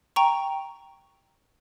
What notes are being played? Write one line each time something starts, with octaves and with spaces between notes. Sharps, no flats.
G5 A#5 C#6